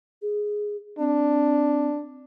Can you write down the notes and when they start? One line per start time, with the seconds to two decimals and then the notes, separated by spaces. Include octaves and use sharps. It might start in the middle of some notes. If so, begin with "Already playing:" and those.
0.22 G#4
0.99 C4 D4